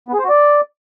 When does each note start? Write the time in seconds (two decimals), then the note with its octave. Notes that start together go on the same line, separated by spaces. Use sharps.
0.08 B3
0.14 G#4
0.19 C5
0.24 F#4
0.29 D5